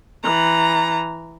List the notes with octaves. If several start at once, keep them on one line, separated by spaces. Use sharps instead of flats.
E3 A#5